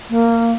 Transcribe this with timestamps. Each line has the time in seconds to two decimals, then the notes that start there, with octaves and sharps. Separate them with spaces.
0.10 A#3